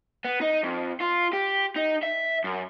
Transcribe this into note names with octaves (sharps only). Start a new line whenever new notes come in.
B3
D#4
F2
F4
G4
D#4
E5
F#2